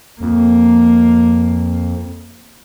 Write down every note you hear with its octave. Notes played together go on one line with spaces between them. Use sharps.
F2 A#3